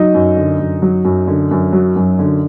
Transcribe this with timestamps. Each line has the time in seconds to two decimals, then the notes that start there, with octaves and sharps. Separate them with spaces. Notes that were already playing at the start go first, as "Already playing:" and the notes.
Already playing: F#3 D#4 D#5
0.14 F#2
0.37 D3
0.59 F#2
0.82 F#3
1.05 F#2
1.28 D3
1.51 F#2
1.73 F#3
1.96 F#2
2.19 D3